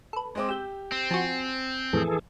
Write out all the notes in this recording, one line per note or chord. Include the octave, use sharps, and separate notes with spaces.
A4 B4
G#3 C4 D6
G4 E6 G6
C4
F3 F#4 G#5
F2 A2 E3 G#4 A4